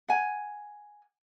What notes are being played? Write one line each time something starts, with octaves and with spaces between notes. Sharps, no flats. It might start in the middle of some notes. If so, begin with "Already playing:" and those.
F#5 G#5